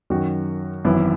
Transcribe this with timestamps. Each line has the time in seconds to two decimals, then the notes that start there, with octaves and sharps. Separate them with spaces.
0.10 F#2 D#3 F#3 C#4 F#4
0.85 G#1 F#2 E3 B3 E4